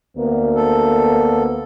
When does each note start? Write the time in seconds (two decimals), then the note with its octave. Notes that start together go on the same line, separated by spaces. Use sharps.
0.18 D2 A#3 B3
0.56 A4